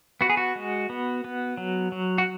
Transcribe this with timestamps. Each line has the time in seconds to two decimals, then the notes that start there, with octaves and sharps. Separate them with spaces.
0.21 B3 F#4
0.30 G#4
0.37 F#4
0.56 G#3
0.90 B3
1.24 B3
1.57 F#3
1.92 F#3
2.18 F#4